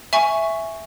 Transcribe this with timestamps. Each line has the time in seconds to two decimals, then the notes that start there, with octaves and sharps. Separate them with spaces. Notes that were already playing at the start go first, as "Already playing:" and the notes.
0.13 E5 G#5 C#6